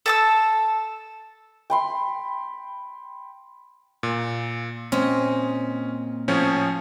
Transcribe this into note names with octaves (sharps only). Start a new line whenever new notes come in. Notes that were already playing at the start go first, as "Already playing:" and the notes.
A4 A5 E6
G5 B5 C6
A#2
A#2 C4 C#4 D#5
A2 F3 C#4